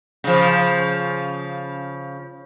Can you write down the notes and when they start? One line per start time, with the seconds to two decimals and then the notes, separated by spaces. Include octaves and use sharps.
0.24 C#3 F3